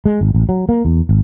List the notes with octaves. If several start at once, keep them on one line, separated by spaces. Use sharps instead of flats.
G#3
G#1
A1
F#3
A#3
E2
G#1